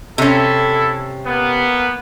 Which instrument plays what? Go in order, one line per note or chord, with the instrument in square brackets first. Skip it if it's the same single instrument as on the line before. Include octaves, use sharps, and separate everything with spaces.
[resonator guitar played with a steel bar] C3 C#4 [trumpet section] E4 A4
[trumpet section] A#3 B3